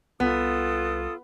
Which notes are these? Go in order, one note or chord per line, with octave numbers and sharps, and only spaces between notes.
C2 B3 F4 A4 D#6